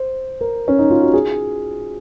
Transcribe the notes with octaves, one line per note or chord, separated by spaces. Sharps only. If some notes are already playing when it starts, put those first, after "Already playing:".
Already playing: C5
A#4
C#4
D#4
F4
F#4
G#4